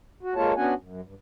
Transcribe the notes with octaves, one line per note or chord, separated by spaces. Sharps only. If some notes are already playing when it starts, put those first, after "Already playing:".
F#4
G#3 A#3 F4 A4 C#5 A5
B3 C#4 D4 F#4 F#5 G#5
F#2
G2